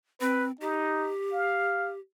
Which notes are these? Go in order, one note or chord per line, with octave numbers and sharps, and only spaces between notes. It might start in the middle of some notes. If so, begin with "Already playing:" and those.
C4 B4
D#4 G4
F5